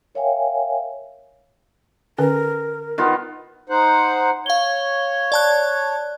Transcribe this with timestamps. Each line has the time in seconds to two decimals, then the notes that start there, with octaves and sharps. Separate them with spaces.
0.15 A#4 C#5 E5 F5 G5 G#5
2.18 D3 C#4 A#4 B4
2.98 D#3 B3 F4
3.69 D#4 C5 F#5
4.46 C#5 F5 G7
5.32 D5 A5 F#6